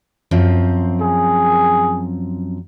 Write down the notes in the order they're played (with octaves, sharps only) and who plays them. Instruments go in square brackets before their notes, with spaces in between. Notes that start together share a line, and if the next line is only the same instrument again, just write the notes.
[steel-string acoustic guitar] F#2 F3 C4
[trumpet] G#4